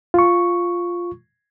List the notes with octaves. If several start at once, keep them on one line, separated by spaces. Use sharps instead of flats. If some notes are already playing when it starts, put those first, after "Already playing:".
F4 C#6